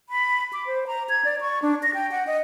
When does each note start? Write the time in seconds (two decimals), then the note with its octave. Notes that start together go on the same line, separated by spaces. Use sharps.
0.09 B5
0.53 D6
0.67 C5
0.87 A#5
1.09 G#6
1.25 D5
1.41 C#6
1.62 D4
1.83 A#6
1.94 G5
2.11 F#5
2.27 D#5